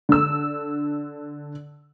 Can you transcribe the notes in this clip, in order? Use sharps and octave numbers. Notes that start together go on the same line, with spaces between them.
D3 E6